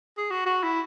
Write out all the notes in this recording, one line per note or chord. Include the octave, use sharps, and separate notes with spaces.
G#4
F#4
F#4
E4